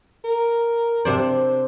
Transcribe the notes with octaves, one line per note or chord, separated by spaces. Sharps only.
A#4
C3 D4 C5 D5